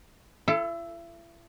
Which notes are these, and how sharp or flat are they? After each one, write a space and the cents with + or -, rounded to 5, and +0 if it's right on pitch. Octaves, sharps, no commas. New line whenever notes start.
E4 +40 A4 +0